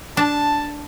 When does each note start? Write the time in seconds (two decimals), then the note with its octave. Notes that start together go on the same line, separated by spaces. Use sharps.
0.17 D4 A5